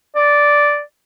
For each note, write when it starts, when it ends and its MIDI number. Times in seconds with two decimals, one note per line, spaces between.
0.16 0.81 74